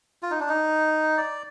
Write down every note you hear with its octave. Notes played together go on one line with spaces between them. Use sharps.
F4
D#4
D4
D#4
D5